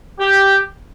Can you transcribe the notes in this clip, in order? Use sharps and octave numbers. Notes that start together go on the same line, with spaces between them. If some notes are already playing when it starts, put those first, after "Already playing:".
G4